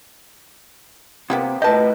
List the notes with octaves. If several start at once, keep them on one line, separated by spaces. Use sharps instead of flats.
C3 A#3 B3 G4
A2 G4 B4 D#5 A5